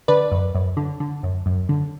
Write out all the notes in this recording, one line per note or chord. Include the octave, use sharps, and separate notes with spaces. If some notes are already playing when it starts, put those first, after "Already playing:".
D3 B4 D5
F#2
F#2
D3
D3
F#2
F#2
D3